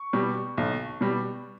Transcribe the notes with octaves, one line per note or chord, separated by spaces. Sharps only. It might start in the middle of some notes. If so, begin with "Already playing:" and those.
Already playing: C#6
B2 G3
B1
B2 G3